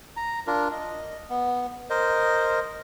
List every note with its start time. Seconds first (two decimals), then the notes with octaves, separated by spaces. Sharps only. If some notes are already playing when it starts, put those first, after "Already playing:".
0.17 A#5
0.47 D4 F4 A#4
0.72 D#5
1.30 B3
1.90 A#4 C5 D#5